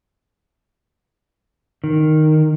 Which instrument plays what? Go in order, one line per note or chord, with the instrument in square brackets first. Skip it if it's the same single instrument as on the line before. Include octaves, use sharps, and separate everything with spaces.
[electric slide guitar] D#3